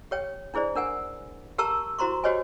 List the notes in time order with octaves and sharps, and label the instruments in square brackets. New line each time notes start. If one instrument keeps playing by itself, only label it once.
[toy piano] G4 C#5 G5
D4 E4 G#4 C5 D5
D4 A#4 F#5 G#5
G4 A#4 A5 A#5 C#6 E6
E4 F#4 C5 A#5 C6 C#6
F#4 G4 C5 C#5 D#5 G#5